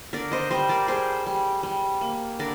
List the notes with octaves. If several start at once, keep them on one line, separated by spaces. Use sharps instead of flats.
D3 A#4 D5
C5 D#5
G3 C5 D#5
A#4 D5
G3 G#4 C5
G3
G3
A#3
D3 A#4 D5